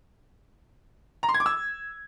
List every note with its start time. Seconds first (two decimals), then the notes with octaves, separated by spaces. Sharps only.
1.23 A#5
1.29 C6
1.34 G#6
1.40 D6
1.46 E6